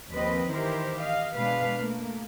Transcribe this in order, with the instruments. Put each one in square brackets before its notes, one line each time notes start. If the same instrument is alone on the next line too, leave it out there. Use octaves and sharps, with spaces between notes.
[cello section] D#2 F3 C4 B4 D#5
D#3 E3 E4 G4 A#4 C5
D#5 F5
B2 G#3 D4 B4 F5
A3 A#3